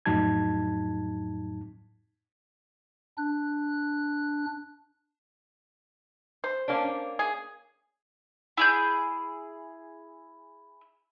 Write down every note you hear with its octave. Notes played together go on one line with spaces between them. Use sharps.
F2 A2 F#3 D#4 A5 G#6
D4 F#6
C5
A#3 C#4 D4
G#4
E4 G#4 G6